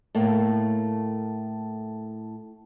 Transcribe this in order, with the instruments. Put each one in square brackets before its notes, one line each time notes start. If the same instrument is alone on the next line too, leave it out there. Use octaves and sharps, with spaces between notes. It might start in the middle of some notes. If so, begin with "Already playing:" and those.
[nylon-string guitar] A2 A3 A#3